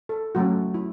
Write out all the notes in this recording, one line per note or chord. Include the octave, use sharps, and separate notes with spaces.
A4
F#3 A3 C#4 F#4
E4